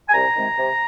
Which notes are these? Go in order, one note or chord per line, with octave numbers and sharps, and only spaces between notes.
G#5
C2 A#5
C3 D#3 G#3 C4
C3